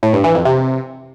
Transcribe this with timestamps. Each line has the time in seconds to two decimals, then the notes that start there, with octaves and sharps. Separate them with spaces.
0.03 A2
0.13 G2
0.24 E3
0.35 F2
0.45 C3